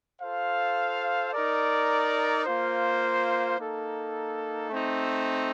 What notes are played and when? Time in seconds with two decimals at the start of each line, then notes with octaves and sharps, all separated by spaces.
0.21 F4 A4 C5 F5
1.33 D#4 A#4 D5
2.45 A#3 F4 C5
3.58 A#3 D#4 A4
4.70 A3 C4 D#4